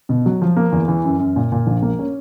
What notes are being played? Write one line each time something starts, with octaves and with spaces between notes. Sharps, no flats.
B2
F#3
F3
A#3
E2
E3
F#2
F#2
A#2
A#2
A#1
A#3
C#4